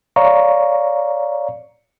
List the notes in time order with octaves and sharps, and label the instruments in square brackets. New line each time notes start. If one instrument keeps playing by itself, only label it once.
[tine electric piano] C#5 D5 F5 A#5 C#6